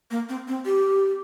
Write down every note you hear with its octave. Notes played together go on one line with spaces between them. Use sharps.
A#3
C4
C4
G4